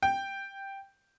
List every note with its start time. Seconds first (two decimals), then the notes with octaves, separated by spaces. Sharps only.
0.03 G5